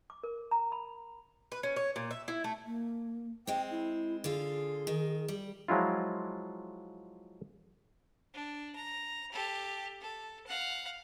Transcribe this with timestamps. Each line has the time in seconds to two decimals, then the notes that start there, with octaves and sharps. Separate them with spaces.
0.10 D6
0.24 A#4
0.51 A#5
0.72 B5
1.52 B4
1.63 C#4
1.76 C#5
1.96 A#2
2.11 E5
2.28 E4
2.44 A3
2.65 A#3
3.47 G#3 C4 G5
3.71 E4
4.24 D3 F4 G#4
4.87 D#3
5.28 G3
5.68 F3 F#3 G#3 E4 F4
8.34 D4
8.76 A#5
9.32 G4 A4
10.01 A4
10.47 F5 F#5